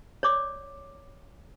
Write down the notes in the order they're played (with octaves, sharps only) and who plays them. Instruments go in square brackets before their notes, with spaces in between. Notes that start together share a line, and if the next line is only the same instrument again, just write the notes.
[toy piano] C#5 D5 D6